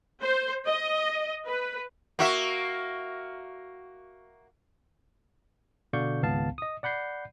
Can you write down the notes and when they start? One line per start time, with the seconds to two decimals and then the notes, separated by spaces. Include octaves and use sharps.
0.23 C5
0.66 D#5
1.46 B4
2.19 A#3 F#4 E5
5.93 B2 D3 D5 F5 C#6 G6
6.22 G#1 C#2 B3 F5 A5
6.58 D#5 D#6
6.83 D5 F#5 B5 G6 C7